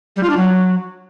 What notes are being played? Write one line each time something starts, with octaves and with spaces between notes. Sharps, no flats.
G3
F4
D4
F#3